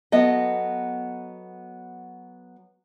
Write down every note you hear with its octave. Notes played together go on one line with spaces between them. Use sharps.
F#3 B3 A4 D#5